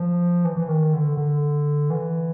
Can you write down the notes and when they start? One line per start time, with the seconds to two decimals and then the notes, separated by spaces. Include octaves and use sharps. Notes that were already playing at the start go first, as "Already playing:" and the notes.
Already playing: F3
0.44 E3
0.57 E3
0.68 D#3
0.93 D3
1.17 D3
1.90 E3